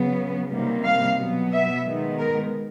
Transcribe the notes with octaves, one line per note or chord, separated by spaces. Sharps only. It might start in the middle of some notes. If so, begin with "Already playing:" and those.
Already playing: C#3 F#3 B3
C3 D#3 G3 A#3
F5
B2 F#3 B3
E5
D#3 G#3 B3
A#4